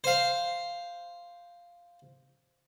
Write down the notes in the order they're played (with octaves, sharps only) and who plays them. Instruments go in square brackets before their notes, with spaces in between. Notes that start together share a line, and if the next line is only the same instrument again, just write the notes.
[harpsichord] C5 F5